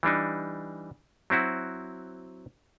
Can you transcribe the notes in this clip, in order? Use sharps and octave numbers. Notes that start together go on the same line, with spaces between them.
E3 G3 D4 D#4
F#3 C4 E4 F#4